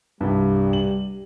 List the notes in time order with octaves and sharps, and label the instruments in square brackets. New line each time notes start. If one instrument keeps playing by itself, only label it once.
[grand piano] C2 G2 [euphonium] G3
[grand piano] F#7